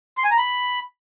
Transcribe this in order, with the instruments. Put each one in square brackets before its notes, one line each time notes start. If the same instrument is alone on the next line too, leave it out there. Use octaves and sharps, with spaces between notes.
[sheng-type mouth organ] C6
G#5
A#5
B5